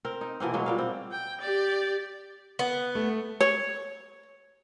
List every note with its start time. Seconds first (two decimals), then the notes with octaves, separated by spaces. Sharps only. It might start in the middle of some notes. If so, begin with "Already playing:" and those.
0.05 C4 A#4
0.21 D#4
0.40 B2 E3 A#3 C4
0.53 B2 F#3 G#3 A#3
0.66 A#2 G3 F5
0.78 C4
1.12 G5
1.41 G4 D5
2.59 B3
2.95 A3
3.40 C#5